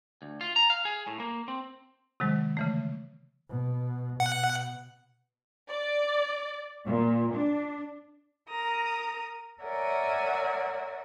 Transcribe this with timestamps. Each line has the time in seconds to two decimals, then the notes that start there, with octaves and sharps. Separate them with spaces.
0.22 D2
0.41 F4
0.56 A#5
0.70 F5
0.85 G#4
1.07 A2
1.20 A#3
1.48 C4
2.20 C3 D#3 F#3 G#3
2.57 C#3 E3 A3
3.49 B2
4.20 B2 F#5
5.68 D5
6.86 A#2
7.34 D4
8.49 A#4 A#5 D#6
9.62 A#4 C#5 D5 E5 F#5 G#5